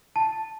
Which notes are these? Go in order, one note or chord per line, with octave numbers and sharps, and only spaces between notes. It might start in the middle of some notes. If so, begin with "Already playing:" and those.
A5